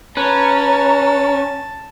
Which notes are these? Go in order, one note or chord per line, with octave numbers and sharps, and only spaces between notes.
C#4 B4 A5 A#5